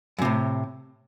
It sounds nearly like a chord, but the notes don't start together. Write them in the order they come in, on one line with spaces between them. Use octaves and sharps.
F#2 C3 A2